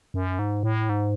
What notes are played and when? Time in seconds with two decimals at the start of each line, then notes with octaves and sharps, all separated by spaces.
0.14 F#2
0.39 G#2
0.63 A2
0.89 G#2